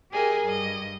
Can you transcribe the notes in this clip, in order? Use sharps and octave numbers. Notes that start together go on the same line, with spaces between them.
G4 G#4 A#4 D#5 G#5
G2 D#5